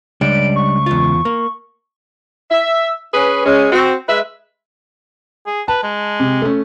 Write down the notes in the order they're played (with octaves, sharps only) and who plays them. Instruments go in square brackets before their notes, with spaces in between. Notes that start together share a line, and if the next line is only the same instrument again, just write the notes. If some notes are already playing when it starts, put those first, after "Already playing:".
[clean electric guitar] C#2 [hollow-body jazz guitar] G3 D4 [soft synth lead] D7
[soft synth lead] C#6
[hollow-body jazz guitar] E2 F4
A#3
[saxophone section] E5
C#4 G#4 B4
G#3 C#4
C4 F#4
G#3 B4 E5
[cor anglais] G#4
[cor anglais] B4 [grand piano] A5
[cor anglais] G#3
[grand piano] C3
A3 C#4